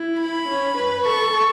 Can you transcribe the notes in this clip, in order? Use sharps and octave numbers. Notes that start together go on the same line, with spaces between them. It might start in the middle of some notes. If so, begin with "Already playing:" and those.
Already playing: E4
B5
C#4
B4
A4 C#6